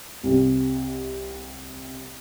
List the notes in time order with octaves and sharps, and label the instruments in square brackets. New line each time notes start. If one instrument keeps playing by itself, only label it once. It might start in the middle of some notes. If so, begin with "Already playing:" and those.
[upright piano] C2 C3